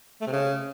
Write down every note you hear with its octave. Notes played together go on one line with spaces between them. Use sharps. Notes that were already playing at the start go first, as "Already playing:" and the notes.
A3
C3
C#3